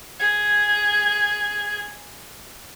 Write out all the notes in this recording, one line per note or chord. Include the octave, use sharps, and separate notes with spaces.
G#4 G#6